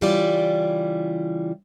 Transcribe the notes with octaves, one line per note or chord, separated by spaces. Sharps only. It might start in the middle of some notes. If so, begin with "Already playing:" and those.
C#3 E3 G3 E4 F4 D5